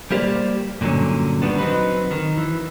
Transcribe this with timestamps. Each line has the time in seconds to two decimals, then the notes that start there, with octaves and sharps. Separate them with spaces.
0.11 G3 A#3 G4 C5 D5
0.81 G2 A#2 D3 F#3 C#4
1.42 D#3 F3 G3 B3 D4
1.58 F#3 C4 D#4 B4
2.11 D#3
2.37 E3